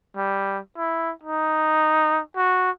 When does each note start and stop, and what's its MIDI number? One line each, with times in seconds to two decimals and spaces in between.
0.16 0.59 55
0.77 1.12 64
1.24 2.21 63
2.36 2.71 66